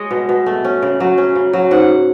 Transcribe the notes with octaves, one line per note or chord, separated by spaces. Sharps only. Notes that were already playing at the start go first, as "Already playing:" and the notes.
Already playing: G#3 C#5 D#5
B2
B2
A3
C#4
C#3
F#3
C#4
C#3
F#3
G#2 F#5